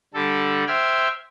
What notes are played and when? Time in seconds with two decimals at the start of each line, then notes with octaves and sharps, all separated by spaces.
0.14 D3 G3 A4
0.67 C5 E5 G5 F6 G#6